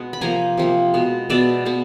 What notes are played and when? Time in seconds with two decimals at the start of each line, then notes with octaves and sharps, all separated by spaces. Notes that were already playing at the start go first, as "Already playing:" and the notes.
Already playing: B2 G#3 B3
0.13 B5
0.21 C3 F3 A#3 G#5 A#5
0.57 C3 F3 A#3
0.94 B2 G#3 B3
1.30 B2 G#3 B3 D5 E5
1.66 B2 G#3 B3